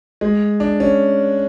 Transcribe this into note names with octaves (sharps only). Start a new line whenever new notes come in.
G#3
D4
C#4